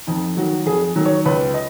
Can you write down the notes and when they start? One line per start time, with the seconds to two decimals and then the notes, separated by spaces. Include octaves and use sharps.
0.07 F2 D#4
0.37 D#3 F#3 F#4
0.66 F2 G#4
0.96 D#3 F#3
1.06 C#5
1.25 C#2 B4
1.54 D#5